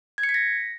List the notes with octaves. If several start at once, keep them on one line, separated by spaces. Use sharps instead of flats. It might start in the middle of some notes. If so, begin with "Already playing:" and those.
G#6
C#7
B6
A#6